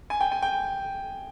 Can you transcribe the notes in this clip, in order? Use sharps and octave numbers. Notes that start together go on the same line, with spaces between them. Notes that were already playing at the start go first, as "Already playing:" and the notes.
G#5
G5
G#5
G5